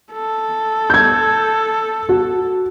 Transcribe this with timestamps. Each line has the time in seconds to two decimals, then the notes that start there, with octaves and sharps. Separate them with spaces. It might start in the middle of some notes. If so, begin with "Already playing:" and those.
0.13 A4
0.90 G6 G#6
2.09 F#4